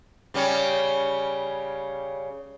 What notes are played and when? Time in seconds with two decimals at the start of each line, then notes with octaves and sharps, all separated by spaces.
0.34 C#3 G3 C#4